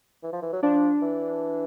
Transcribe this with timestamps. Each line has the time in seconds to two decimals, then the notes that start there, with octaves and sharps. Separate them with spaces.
0.23 E3
0.33 F3
0.42 E3
0.53 F#3
0.63 F3 D4
1.02 E3